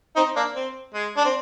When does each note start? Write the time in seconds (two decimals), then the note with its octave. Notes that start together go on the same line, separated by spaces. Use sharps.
0.16 C4 D#4
0.36 A#3 D4
0.55 C4
0.94 G#3
1.17 D4
1.25 C4